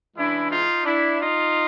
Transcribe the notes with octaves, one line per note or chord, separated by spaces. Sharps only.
C#3 E3 G#3 D4 E4
D#4 F4
D4 E4
D#4 F4